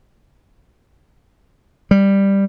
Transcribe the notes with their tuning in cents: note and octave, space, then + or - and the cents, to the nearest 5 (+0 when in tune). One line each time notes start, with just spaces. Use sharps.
G3 +5